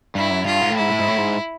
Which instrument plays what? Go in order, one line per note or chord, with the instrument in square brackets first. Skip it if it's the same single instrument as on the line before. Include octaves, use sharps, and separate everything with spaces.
[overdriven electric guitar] G2 [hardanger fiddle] E4
[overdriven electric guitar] F#2
[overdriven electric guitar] G2 [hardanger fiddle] F4
[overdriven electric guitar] G#2
A2
[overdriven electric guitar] G#2 [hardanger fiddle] E4
[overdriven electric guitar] A2
G#2
A2
G#2